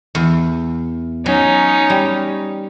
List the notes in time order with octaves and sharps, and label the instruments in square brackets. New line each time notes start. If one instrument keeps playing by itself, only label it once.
[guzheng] E2
[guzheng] F#3 [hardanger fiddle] C#4 D#4
[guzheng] G3